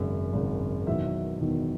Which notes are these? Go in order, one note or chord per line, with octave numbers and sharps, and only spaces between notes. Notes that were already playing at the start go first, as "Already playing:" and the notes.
Already playing: G#1 F#2 C#3
G#1 F#2 C#3
E1 E2 D#3 F#3 E5
E1 E2 D#3 F#3